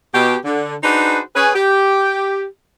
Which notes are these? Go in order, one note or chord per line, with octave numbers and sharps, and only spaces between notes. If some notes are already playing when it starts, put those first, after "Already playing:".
B2 G4
D3
D4 D#4 F#4 G#4 B4 C5
C#4 G#4 B4
G4